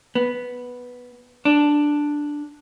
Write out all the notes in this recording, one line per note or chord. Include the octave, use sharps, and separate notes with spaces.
B3
D4